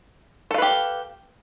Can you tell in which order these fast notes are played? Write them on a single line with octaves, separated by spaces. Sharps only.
A4 F5 B4 G4